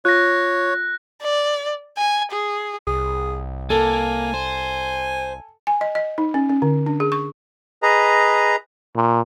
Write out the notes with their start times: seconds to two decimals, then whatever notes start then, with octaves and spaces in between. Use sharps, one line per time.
0.05 F4 C#5 F#6 A#6
1.22 D5
1.97 G#5
2.31 G#4
2.87 C2 G#4
3.70 A#3 A4 G#5
4.34 C5
5.67 G#5
5.81 D#5
5.95 D#5
6.18 D#4
6.34 C#4
6.49 C#4
6.62 D3
6.86 D4
7.00 G#4
7.12 C#6
7.83 G#4 B4 D#5 A#5
8.95 A#2